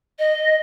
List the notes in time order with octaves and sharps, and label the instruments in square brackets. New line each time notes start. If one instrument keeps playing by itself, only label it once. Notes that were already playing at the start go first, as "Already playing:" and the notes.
[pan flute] D#5